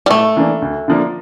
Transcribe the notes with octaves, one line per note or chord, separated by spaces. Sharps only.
G3
A2 A3
E3 A#3 D4
D2
D3 F3 A#3 D4